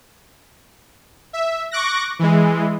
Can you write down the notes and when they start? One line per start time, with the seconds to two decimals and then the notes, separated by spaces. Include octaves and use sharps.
1.33 E5
1.71 C#6 D6 F#6 A#6
2.19 E3 G#3